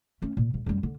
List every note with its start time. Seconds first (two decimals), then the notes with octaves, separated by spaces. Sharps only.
0.22 A3 C#4
0.37 A#2
0.54 G#2
0.66 F#2 G3
0.83 D3